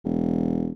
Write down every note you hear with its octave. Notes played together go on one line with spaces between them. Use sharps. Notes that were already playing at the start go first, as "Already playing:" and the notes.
E1